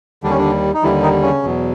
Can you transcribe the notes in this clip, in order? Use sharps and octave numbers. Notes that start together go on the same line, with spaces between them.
D#2 D3 G3 D4
C#4
D3 D4
D#4
D#2 D3 E3 G3 E4
D#3 D#4
C#3 C#4
E2 B2 F#3